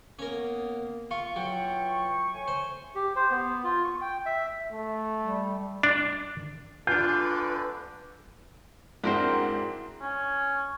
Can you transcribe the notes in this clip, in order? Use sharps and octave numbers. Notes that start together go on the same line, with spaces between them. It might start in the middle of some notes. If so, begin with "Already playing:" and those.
A#3 B3 C#4 A#4
F4 C#6
E3 F#3 F4 G5
A3 C#5 G#5
C5
G4
C5
B3
F4
C#6
G5
E5
A3
G3
D4
A1 D3 D4 F4 B4 G6
G#2 C4 D4 E4 F#4 A#4 C5
C#4